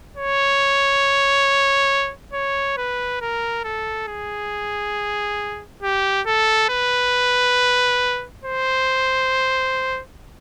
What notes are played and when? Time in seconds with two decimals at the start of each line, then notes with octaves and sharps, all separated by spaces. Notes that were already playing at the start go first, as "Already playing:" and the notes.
0.16 C#5
2.34 C#5
2.77 B4
3.21 A#4
3.64 A4
4.08 G#4
5.83 G4
6.27 A4
6.69 B4
8.44 C5